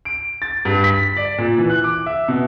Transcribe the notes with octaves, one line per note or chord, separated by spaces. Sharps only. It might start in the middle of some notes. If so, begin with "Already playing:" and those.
D7
A6
G2
B6
D5
A#2
E3
F#6
D6
E5
B2